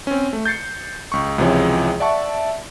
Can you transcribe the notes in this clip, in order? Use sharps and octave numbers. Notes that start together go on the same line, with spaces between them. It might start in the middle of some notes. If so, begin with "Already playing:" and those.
C4 C#4
A3
G6 A6 C7 C#7
C#2 C#6
C#2 C3 E3 F3 G#4 C#5
D5 E5 F#5 A5 C#6